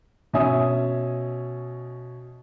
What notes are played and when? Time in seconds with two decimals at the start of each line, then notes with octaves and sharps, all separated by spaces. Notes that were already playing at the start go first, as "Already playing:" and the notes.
0.33 B2 C#4 E5 G#5 D#6